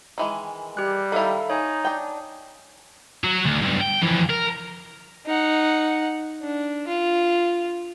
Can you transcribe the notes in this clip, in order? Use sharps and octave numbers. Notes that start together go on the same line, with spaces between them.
D#3 E3 G#3
G3 G4 F#6
D#3 E4 A4 F5 A#5
D#4 C#5 G#5
D4 G5
F#3 F#4
D2
B1 G2
G5
F2 E3
A#4
D#4 F#5
D4
F4